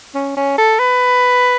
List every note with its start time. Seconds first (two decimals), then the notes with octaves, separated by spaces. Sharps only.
0.15 C#4
0.37 C#4
0.58 A4
0.79 B4